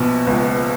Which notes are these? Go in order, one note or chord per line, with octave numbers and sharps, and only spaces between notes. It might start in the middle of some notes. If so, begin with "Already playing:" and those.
Already playing: A#1 B2
C#2